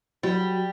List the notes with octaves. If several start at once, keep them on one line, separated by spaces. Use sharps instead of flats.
F#3 G3